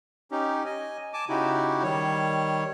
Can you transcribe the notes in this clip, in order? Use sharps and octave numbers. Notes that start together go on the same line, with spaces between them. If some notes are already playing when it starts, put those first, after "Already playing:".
C#4 D#4 G4
D#5 G#5
G#5 A5 D6
C#3 D#4 E4 F#4 G4
D#3 G3 C#5